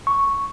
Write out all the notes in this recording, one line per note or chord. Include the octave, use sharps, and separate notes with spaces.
C#6